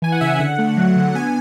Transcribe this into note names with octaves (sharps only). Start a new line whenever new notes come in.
E3 G#5
F#5
C#3 E5
D3 F#5
A3
F#3
D3
B3 G#5